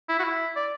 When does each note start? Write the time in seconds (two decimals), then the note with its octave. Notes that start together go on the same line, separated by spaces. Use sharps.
0.09 E4
0.19 F#4
0.24 E4
0.56 D5